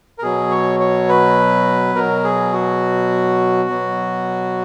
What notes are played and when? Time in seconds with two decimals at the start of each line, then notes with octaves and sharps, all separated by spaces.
0.18 A#4
0.22 B2 F#3 G#4
0.51 C#5
0.80 C#5
1.09 B4
1.95 B2 F#3 A#4
2.24 G#4
2.53 F#4
3.69 B2 F#3